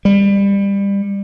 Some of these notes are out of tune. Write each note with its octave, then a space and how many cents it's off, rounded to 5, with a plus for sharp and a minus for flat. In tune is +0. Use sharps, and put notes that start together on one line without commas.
G3 +25